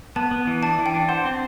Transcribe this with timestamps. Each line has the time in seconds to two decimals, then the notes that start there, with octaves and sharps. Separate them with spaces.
0.16 B3 A5
0.31 B3
0.47 E3
0.63 D4 A5
0.78 E3
0.86 G5
0.94 D4
1.09 C5 F#5
1.25 C4